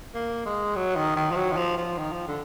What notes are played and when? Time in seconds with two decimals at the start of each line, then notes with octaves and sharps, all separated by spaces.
0.14 A#3
0.46 G#3
0.76 F#3
0.96 D#3
1.16 D#3
1.31 F3
1.36 F#3
1.52 D#3
1.57 F3
1.78 F3
1.98 D#3
2.13 F3
2.28 D3